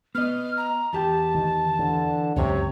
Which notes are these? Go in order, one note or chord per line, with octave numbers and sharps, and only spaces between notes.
B3 D#5 F6
A#5
E2 G4 G5 A5
D#3
D3 E3
C#2 F#2 C3 D#3 C#5